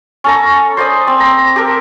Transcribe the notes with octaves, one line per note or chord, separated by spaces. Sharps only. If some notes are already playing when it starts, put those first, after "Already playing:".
C#4 A4 A#5
C5 D5 B5 D#6
C4
A#5
G4 A4 A#4